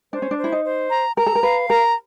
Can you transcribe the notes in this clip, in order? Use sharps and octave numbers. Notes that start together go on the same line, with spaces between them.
D4 C5
C#4
D4
C5
E4
D#4
C5
A#5
A#4 A#5
A4
A#4
B4 F5
A#4 A#5